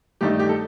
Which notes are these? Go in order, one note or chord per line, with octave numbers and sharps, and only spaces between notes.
G2 D#3 A3 D#4 G4
G4
A4